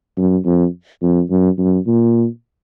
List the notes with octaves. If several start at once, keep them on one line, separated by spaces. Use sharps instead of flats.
F#2
F2
F2
F#2
F#2
A#2